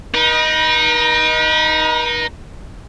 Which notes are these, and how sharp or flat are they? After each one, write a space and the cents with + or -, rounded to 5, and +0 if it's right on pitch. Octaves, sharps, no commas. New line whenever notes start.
D#4 +0 B4 -45